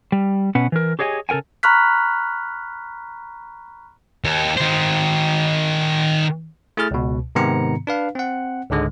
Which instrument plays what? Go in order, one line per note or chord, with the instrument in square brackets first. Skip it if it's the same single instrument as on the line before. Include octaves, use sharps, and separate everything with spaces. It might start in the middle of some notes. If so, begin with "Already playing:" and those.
[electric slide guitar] G3
B2 C#4 B4 F#5
E3 A#4
G4 G#4 C#5 D#5 F#5 G#5
C#3 A4 A#4 G5 G#5
[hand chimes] A#5 B5 C#6 F6 F#6 B6
[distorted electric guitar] D#2
D#3 C5
[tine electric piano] A3 E4 G#4 F6 A6
C#2 B2
G#2 C3 D#3 B3 A#5 C#7
D4 B4 F5
C4 F#5
C#2 G#2 D3 G#3